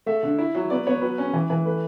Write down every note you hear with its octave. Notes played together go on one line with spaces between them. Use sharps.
A3 E5
D3
E4
F#3
B3 D5
B3 C#5
F#3 B4
C#4
E3
E3
A3 B4